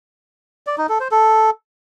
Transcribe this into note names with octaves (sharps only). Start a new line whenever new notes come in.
D5
D#4
A4
C5
A4